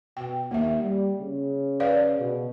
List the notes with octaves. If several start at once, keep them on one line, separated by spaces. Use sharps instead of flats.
B2 G5
D#2 A#3 E5
G3
C#3
B4 D5 F5
B2